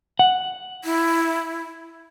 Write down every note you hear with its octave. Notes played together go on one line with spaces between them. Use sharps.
F#5
E4